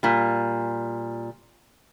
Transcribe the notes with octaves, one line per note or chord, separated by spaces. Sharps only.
A#2 G3